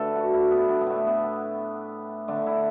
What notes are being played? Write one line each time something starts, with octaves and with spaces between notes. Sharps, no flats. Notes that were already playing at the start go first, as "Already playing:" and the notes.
Already playing: D3 A3 A4 B4
F#4
E4
B3
D4
B3
A2 A3
B3
D3 A3 D4
E4